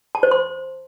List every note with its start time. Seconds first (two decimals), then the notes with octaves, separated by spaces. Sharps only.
0.15 A5
0.23 C5
0.31 C6